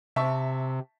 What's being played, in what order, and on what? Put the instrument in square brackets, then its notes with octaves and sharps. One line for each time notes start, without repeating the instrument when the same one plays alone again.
[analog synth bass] C3 [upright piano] E5 A5 C#6